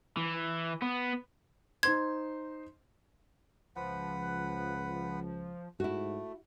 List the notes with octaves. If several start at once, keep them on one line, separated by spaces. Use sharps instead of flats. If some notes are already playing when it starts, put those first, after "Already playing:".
E3
B3
D#4 C5 C6 G#6
C#2 F3 B4 F#5
G#2 A3 E4 F#4